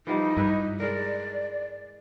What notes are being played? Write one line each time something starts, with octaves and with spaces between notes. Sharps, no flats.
E3 F3 G3 D#4
G2 E4 B4 E5
G#3 A#4 D5